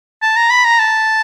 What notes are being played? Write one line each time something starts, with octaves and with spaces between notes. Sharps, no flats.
A5
A#5
B5
A#5
A5